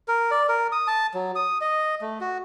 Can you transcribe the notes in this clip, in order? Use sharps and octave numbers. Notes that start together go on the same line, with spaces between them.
A#4
D5
A#4
D#6
A5
F#3
D#6
D#5
A3
F#4